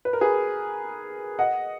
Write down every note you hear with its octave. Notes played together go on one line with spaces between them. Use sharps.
B4
A#4
G#4 B4
D#5 F#5